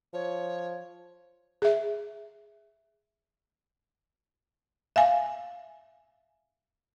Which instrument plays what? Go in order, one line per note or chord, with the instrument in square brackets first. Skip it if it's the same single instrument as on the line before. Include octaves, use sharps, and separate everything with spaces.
[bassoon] F3 [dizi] C#5
[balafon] G#4 E5
[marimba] E5 F5 G#5